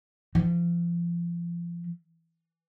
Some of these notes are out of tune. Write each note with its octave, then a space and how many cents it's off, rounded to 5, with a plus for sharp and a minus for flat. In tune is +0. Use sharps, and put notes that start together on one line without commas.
F3 -30